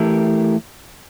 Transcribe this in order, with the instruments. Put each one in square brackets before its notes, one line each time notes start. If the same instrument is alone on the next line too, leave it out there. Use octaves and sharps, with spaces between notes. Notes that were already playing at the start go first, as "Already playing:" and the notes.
Already playing: [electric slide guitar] E3 A3 E4 G4 A#4